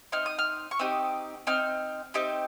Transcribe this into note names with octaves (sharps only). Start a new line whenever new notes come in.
C4 D#4 F6
D#6
F6
C#6
C4 D#4 G4 D#6
C4 D#4 F6
C4 D#4 G4